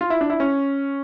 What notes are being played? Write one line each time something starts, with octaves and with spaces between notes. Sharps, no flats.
F4
E4
D4
E4
C#4